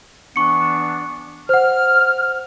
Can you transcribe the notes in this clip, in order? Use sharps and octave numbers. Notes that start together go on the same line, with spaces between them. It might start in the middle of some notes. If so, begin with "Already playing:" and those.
E3 B3 D4 C#6 C#7
C5 F#5 F6